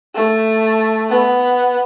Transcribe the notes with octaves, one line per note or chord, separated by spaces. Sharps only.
A3
B3